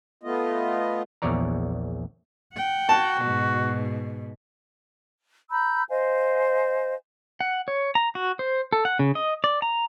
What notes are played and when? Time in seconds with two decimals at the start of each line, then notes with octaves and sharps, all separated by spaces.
0.23 A3 B3 F4 D#5
1.22 A#1 E2 C#5 D5 A#5
2.54 F#5 G5
2.89 F#4 A5
3.21 G#2 B2
5.51 A#5 B5 E6 G6
5.89 C5 D#5 F5 G#5
7.40 F#5
7.68 C#5
7.95 A#5
8.15 F#4
8.39 C5
8.73 A4
8.85 F#5
8.99 C#3
9.15 D#5
9.44 D5
9.62 A#5